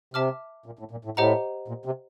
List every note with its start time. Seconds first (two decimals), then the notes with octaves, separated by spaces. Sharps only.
0.14 C3 E5 A5 D6 F6
0.66 A#2
0.79 A2
0.91 A#2
1.05 A2
1.17 A2 G4 C5 D#5 F#5 A#5
1.68 A#2
1.86 C3